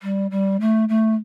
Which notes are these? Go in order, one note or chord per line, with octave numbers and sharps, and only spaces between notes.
G3
G3
A3
A3